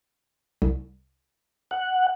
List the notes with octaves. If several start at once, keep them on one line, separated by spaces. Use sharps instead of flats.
C2
F#5